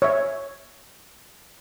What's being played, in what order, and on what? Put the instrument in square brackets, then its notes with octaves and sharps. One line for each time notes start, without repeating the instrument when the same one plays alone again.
[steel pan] C#5 E5